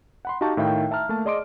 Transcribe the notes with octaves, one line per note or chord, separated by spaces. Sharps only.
F#5 B5 C6
D#4 F#4 G4 F5 A5 C#6
A2 D#3 E5 F5 G5
E5 A5 A#5 F6
A3 A#3 A5
G#4 D5 D#5 C6 D6 D7